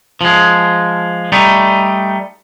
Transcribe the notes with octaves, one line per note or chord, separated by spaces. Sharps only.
F3 G#3
G3 A3 D#4